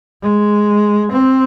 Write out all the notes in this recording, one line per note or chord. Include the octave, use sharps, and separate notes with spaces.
G#3
C4